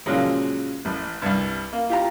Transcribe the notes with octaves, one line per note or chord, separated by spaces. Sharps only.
A#2 C#3 F3 F#3 G#3
A1
C2 G2
A#3
F4 G4 A#5